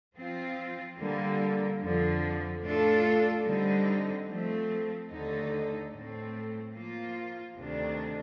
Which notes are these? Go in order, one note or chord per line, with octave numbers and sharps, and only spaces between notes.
F3 C4 F4
D3 G3 A#3
F2 D3 F3
A2 A3 D4 F4 A4
D3 G3 C4 D#4
F3 A3 C4
D#2 D3 A3 D#4 A4
A2 A3 C4
F3 A#3 F4
D2 C3 D#3 A3 D4